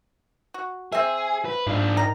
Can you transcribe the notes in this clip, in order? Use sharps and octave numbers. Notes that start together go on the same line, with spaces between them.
F#4
C4 G#4 E5
B4
G#2 D4 F4
D#3 A#5